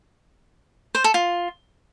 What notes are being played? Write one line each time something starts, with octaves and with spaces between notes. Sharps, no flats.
C5
A4
F4